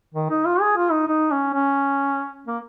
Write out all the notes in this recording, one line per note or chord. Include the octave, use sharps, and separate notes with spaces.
D#3
D#4
F4
G#4
F4
D#4
D#4
C#4
C#4
A#3